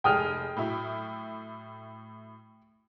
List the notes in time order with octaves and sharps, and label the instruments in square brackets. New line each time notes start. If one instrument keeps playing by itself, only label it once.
[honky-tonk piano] F1 G#3 G#4 [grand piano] G5 D#6 F6
[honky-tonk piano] A2 F#3 E4